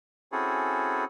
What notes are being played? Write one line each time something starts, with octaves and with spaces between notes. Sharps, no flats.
C4 C#4 E4 F#4 G#4 A4